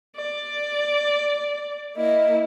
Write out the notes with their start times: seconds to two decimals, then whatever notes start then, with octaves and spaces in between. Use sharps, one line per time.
0.16 D5
1.96 A#3 E4 D#5